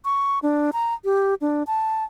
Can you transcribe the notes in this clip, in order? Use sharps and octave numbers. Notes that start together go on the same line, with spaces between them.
C#6
D4
A#5
G4
D4
A5